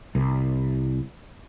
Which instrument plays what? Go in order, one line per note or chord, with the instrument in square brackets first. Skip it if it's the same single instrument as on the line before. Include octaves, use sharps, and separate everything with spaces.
[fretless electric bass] C2